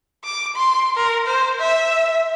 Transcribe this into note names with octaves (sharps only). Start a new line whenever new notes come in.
D6
C6
A#4
C5
E5